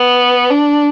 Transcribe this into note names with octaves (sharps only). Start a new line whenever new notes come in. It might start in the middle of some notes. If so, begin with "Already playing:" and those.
Already playing: B3
D4